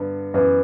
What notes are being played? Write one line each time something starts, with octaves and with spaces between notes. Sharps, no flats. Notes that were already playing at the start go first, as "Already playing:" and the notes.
Already playing: G2 D3 B3
F#2 E3 B3